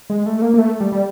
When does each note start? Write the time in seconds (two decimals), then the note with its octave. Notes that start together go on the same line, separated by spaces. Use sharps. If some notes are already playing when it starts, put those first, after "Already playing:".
0.10 G#3
0.26 A3
0.42 A#3
0.54 A#3
0.58 A3
0.80 G3
0.92 G3